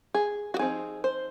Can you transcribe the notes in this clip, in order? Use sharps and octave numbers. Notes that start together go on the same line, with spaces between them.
G#4
F#4
F3 C4 D#4 G#4
C5